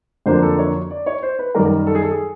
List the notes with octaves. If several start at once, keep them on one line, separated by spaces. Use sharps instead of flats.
F2 D3 F#3 A#3 D4 C5
A4
C#5
D5
C#5
C5
B4
F#2 D#3 G3 A#4
A#4
A4
G#4
A4
G#4